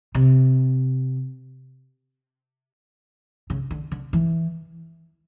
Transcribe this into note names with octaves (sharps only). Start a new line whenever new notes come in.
C3
C#3
D3
D3
E3